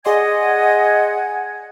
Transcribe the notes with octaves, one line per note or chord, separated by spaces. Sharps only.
G#4 D5 D#5 F#5 G#5 C6 G#6